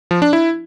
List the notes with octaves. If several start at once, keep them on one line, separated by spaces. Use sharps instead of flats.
F3
D4
E4